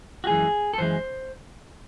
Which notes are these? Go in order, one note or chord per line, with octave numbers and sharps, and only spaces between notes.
F#4
F#2 E3 G#3 G#4
A4
F#2 E3 G#3 C5